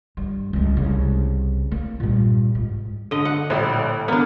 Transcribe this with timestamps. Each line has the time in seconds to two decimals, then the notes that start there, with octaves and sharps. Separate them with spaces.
0.17 G2
0.53 C#2 G3
0.77 C2 C#3
1.71 A#3
2.00 G2 A#2
2.55 G#2
3.11 D3 D#5
3.25 F#5
3.50 A#1 A2 G3
4.08 A#3 B3 D4